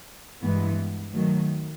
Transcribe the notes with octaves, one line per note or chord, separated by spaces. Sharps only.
G2 E3 G#3 B3
D#3 F#3 A3